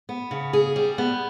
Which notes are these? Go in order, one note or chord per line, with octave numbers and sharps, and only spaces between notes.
B3
C#3
G#4
G3
B3